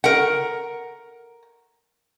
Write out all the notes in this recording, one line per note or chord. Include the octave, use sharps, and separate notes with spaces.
A#4 F#5